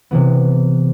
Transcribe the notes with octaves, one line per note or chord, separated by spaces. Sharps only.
C3 E3 B3